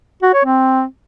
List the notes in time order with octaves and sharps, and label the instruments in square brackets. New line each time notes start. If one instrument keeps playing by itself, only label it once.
[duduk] F#4
C#5
C4